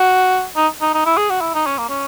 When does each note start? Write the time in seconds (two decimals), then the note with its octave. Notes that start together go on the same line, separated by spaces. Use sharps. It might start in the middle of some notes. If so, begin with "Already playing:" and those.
Already playing: F#4
0.56 D#4
0.81 D#4
0.94 D#4
1.06 E4
1.17 G#4
1.30 F#4
1.41 E4
1.54 D#4
1.66 C#4
1.78 A#3
1.89 C#4